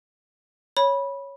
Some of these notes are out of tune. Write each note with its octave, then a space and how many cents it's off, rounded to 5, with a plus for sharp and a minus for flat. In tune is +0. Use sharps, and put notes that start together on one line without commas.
C#5 +0 B5 -15